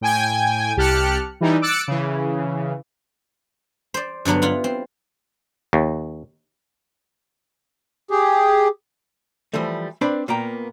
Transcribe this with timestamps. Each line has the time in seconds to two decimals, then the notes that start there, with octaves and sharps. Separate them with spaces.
0.01 A2 G5 G#5 G#6
0.77 C2 G4 A5 F6 F#6 C#7
1.41 E3 G3 D#4
1.62 D6 E6 F#6 A6 C#7 D7
1.88 C#3 E3
3.94 C5 D5
4.25 G2 D3 F#3 B3 D4
4.42 E4 F4 F#5
4.64 C4
5.73 D#2
8.11 G4 G#4
9.53 E3 F3 G3 A3
10.01 C4 D4 B4 D5 B5
10.28 A#2 A#3 B3 G5 A#5